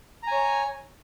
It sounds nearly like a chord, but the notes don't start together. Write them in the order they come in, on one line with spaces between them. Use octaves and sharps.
A#5 G#5 C#5